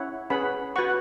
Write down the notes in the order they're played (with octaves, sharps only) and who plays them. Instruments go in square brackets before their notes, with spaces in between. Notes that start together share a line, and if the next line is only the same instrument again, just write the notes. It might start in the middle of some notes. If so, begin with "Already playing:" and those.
Already playing: [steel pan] C#4 E4 C#5 F#5
C#4 G#4 B4 F#5 B5
F#4 B4 F#5 C#6